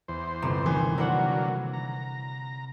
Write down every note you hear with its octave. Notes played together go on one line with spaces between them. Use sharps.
E2 C5
G1 C3 E7
D#3 E3
D3 F#3 A#3 E4 C5 F#5
A#5